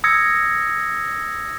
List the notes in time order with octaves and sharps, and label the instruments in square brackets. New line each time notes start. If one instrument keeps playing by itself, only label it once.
[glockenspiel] D#6 E6 G#6 A#6 C#7